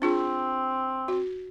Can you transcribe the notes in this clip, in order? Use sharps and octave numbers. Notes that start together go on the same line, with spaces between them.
C4 D4 F4 G#4
F#4